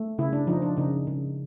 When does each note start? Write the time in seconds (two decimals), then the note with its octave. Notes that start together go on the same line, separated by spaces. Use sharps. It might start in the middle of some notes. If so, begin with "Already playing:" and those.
Already playing: A3
0.19 C#3 E4
0.33 D4
0.47 F3 D#4
0.62 D4
0.77 C#3 D#4
1.07 C#3